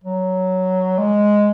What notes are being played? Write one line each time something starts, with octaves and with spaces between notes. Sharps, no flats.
F#3
G#3